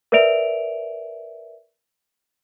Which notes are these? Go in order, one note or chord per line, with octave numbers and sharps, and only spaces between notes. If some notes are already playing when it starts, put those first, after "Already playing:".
A#4 B4 D5 E5 D7 F7